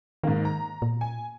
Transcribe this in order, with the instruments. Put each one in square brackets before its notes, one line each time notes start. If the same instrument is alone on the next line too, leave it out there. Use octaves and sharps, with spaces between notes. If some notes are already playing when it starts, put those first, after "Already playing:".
[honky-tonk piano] G#2 A#3 [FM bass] D#3
[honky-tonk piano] A#5
[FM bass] A#2
[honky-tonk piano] G#5